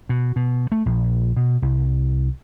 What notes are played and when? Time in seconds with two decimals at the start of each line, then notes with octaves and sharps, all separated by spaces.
0.09 B2
0.36 B2
0.72 A3
0.86 A#1
1.37 B2
1.62 C2